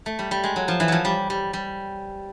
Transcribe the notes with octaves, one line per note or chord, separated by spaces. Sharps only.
A3
G3
G3
G#3
F#3
F3
E3
F3 F#3
G3
G3
G3